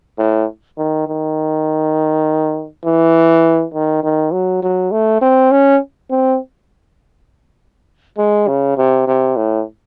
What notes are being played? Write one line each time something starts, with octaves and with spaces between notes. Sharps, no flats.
A2
D#3
D#3
E3
D#3
D#3
F#3
F#3
A3
C4
C#4
C4
G#3
C#3
C3
C3
A2